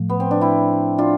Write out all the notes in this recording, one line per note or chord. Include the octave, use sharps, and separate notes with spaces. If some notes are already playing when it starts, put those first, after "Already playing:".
Already playing: A2 F3 A3
B3
C4
D4
C4 E4
D4 F4